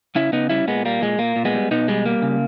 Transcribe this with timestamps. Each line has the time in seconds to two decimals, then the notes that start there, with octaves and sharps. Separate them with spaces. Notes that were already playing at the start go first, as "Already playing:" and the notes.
0.15 C#3 C#4 E4
0.32 C#3 B3 D#4
0.50 G3 C#4 E4
0.68 A#2 G#3 B3
0.85 G3 A#3
1.01 A#2 G#3
1.19 A#2 A#3
1.36 A#2
1.45 G#3 B3
1.54 G3
1.71 B2 B3 D#4
1.88 G3 G#3
2.06 G3 A#3
2.22 C#3